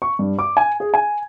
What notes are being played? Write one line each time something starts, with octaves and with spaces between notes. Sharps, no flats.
C#6
G2
D6
G#5
G#4
G#5